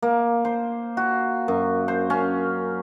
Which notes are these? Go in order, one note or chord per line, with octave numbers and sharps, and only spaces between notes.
A#3
C5
F#4
F#2
C5
C#4